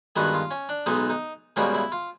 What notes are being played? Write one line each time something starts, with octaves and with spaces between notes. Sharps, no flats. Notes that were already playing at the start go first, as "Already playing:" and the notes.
G2 D#3 G#3 B3 F#4
F4
C#4
D4
B1 B2 G#3 B3 D#4
D#4
C#2 B2 G3 A#3 C#4
E4
F4